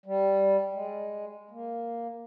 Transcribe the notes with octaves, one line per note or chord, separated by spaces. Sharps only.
G3
G#3
A#3